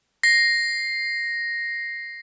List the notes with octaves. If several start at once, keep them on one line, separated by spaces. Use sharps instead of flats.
A#6 C7